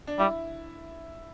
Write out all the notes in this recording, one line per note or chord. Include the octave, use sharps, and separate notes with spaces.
D4
G3 E4